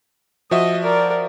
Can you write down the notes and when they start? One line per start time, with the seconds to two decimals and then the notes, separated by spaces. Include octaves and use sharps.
0.51 F3 F#4 D#5 E5
0.83 A#4 D5